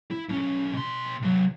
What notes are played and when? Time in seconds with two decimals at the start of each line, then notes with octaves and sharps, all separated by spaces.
0.11 E4
0.29 B1 C#4
0.73 B2 C6
1.23 C3 F#3